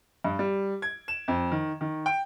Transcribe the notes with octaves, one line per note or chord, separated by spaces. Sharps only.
G2
G3
G#6
E7
F2
D#3
D#3
G5